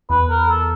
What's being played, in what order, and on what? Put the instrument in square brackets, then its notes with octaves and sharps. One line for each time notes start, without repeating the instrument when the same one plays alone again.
[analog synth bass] E2 [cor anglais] B4
[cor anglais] A#4
A4